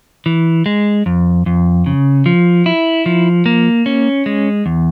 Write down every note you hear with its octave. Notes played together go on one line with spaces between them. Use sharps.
E3
G#3
F2
F2
C#3
F3
E4
F3
A#3
C#4
G#3
E2